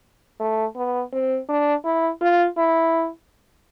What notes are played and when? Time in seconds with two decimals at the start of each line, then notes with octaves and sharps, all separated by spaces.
0.40 A3
0.76 B3
1.13 C4
1.49 D4
1.85 E4
2.21 F4
2.58 E4